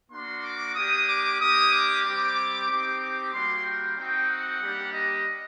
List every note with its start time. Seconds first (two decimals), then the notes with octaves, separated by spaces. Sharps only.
0.11 A#3 D4 F#4 C6
0.43 D6
0.75 A#3 D4 G4 D#6
1.08 D6
1.39 A#3 D4 G4 D#6
1.72 D6
2.03 G3 C4 G4 D6
2.68 C4 D#4 G4 D6
3.00 D6
3.32 G3 A#3 F#4 C6
3.64 G5
3.97 C4 D#4 F#4 G5
4.29 F#5
4.61 G3 A#3 D4 G4
4.93 D#5